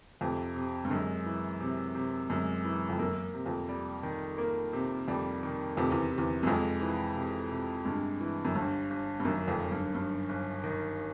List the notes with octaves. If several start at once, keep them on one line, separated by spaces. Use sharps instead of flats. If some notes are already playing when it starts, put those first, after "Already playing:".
F2 C3
C3
G2
F#2 G#3
E3
C3
C3
F#2 G#3
E3
F2
F#2 A#3
C3
F2
G3
D#3
A#3
C3
F2 G3
D#3
F2 C3
E2
C3
E2
F#2
F2 G#3
E3
C3
C3
G2 G#3
E3
F#2
G1 G2
G1
G2
F#2 D#3
F2
F#2
G2
G1 G2
G1
D#3